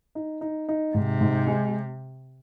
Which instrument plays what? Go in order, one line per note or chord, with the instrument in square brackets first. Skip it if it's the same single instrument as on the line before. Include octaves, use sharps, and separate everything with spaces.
[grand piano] D#4
D#4
D#4
[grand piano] G#2 [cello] C3
[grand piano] G#2
G#3